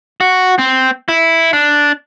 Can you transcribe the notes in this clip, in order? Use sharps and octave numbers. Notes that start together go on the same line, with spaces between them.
F#4
C4
E4
D4